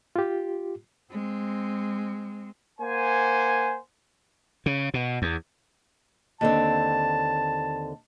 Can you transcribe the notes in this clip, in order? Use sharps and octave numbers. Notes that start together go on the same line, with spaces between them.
F4 G4
G#3 C4
A#3 C5 F#5 G#5
C#3
B2
E2
D#2 D3 C4 A5